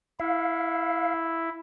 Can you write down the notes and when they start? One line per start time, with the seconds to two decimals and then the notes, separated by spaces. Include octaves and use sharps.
0.20 E4 F5